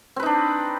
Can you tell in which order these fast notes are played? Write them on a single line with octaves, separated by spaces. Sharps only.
C4 B4 D#4 D4